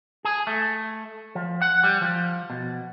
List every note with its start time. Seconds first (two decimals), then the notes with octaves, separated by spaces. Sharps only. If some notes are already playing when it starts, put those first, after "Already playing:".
0.25 G#4
0.47 A3
1.35 F3
1.62 F#5
1.83 G3
2.01 F3
2.50 B2